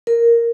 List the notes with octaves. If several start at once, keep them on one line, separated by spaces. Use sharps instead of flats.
A#4